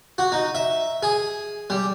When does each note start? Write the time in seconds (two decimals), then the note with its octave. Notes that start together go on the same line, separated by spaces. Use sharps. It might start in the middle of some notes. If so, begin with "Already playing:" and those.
0.18 F#4
0.32 D#4
0.55 E5
1.03 G#4
1.70 G3